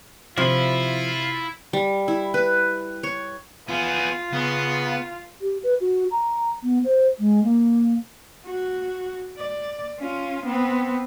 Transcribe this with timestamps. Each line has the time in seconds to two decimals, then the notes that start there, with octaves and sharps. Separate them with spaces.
0.38 C3 F3 E4 F4
1.73 G3
2.08 E4
2.34 B4
3.03 C#5
3.68 B3 F4 G#4
4.33 C#3 B3
5.42 G4
5.63 B4
5.81 F#4
6.12 A#5
6.63 B3
6.84 C5
7.19 G#3
7.44 A#3
8.47 F#4
9.38 D5
9.99 C#4 F4
10.45 B3 C4